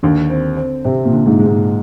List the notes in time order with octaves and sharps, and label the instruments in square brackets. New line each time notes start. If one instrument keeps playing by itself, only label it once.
[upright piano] D#2 [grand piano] D3
[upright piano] C4
C4
[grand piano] C3 [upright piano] C4
[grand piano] A#2
[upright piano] D3
[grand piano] G#2
[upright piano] G#3
[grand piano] G#2